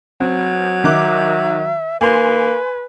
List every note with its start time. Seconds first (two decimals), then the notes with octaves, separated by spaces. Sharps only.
0.20 F#3 C4
0.84 D#3 E5 D6 F#6
2.01 A#3 B4 G#5 C6